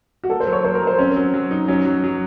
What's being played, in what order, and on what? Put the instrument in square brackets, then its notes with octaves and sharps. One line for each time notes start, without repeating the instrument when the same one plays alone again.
[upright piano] F#4
[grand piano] A#3 [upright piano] A4
[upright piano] C5
[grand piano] F#3
[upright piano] C#5
[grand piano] A#3 [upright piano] C5
[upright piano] A#4
[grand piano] F#3
[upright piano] C5
[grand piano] C4 [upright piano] C#4
[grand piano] F#3
F#3
D#4
[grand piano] F#3 [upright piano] C#4
[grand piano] F#3
F#3